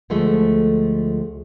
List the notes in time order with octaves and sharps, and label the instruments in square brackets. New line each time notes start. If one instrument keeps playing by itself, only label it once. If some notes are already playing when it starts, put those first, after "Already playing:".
[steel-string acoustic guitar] D2 F3 G#3 A3